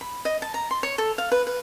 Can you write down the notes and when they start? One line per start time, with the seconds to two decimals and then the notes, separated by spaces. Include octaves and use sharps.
0.01 B5
0.25 D#5
0.42 A5
0.54 A#5
0.71 C6
0.83 C#5
0.98 A4
1.18 F5
1.32 B4
1.47 B4